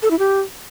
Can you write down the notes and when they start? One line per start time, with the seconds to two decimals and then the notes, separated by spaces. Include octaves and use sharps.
0.02 A4
0.11 E4
0.19 G4